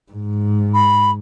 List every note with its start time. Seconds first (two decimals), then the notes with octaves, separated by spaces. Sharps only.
0.12 G#2
0.74 B5